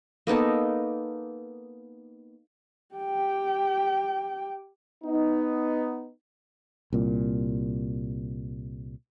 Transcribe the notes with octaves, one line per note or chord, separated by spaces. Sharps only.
A#3 B3 D#4 A4
G4 G5
B3 D#4
C2 A#2